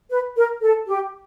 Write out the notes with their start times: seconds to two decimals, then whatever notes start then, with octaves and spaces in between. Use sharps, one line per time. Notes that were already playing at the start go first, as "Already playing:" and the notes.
0.10 B4
0.37 A#4
0.63 A4
0.88 G4